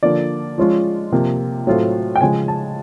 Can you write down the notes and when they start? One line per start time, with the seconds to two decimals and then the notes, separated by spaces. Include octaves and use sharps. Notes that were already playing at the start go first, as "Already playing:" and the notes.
0.03 D3 F3 A#3 D5
0.58 F3 G#3 C#4 F4
1.12 C3 F3 A#3
1.67 A2 F#3 A3 C4 F4
2.16 G5
2.21 C#3 F3 G#3 G#5
2.48 A5